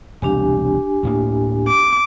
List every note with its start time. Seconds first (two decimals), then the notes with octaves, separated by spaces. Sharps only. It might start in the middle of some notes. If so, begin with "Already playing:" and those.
0.22 E1 C2 D4 G4 G#5
1.03 D2 A2 A#3
1.68 D6